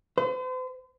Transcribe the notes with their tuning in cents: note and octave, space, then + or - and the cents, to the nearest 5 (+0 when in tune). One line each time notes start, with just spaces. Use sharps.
C5 -45